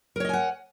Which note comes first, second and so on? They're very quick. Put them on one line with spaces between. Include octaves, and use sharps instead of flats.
A#4 C#5 D#5 G#5 F#5